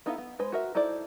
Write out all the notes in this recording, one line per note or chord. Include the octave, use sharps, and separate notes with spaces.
B3 D#4 E4 A4 F5
B3
G#3 B4 C5
F#4 A#4 E5
D#4 E4 A4 C5 D5